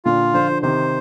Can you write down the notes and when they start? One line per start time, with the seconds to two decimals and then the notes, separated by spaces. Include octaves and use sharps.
0.05 A#2 D3 F4
0.34 D3 F3 C5
0.62 C3 D#3 C5